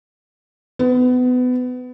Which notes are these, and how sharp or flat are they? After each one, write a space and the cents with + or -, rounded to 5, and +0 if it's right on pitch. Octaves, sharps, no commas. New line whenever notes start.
B3 +25